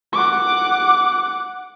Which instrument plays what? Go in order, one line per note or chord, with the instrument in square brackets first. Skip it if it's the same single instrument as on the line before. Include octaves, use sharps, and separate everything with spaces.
[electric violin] F#5 D6